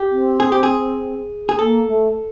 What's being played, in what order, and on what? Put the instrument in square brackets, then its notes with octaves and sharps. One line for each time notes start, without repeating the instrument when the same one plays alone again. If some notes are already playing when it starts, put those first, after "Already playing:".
Already playing: [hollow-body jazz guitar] G4
[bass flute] C4
[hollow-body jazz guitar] G#4
G4
G#4
G#4
[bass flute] A#3 [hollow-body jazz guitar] A4
[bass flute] A3